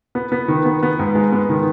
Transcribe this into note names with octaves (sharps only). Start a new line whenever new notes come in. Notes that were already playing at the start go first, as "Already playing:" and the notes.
B3
B3
D#3
B3
B3
G#2
G#3
B3
D#3